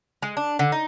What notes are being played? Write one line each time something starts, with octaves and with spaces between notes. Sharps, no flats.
G#3
D4
D3
D#4